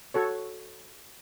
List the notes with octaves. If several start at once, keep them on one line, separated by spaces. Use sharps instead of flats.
F#4 A4 C#5